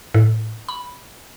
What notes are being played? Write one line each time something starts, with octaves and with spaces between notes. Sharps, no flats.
A2
B5